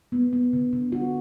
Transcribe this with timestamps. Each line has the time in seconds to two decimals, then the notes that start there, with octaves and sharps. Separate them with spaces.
0.12 B3
0.33 B3
0.53 D3
0.73 D3
0.92 F#4